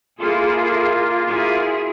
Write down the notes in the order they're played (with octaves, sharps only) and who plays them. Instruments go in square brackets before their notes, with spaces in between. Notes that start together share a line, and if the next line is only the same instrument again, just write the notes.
[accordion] A#3 F4 [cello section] E4 G#4 A4
[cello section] E4 F#4 G#4